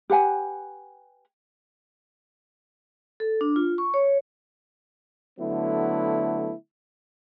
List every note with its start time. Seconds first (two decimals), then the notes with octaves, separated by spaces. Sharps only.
0.10 G4 B4 F#5 G#5
3.20 A4
3.41 D4
3.56 F4
3.78 C#6
3.94 C#5
5.39 D3 F#3 A3 B3 E4